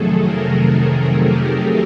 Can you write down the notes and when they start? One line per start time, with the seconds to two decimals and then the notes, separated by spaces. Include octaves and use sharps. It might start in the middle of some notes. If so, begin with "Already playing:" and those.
Already playing: F2 C3 D#3 F#3 A3 G#4 A4
0.24 A#4
0.58 A4
0.92 A4
1.26 G4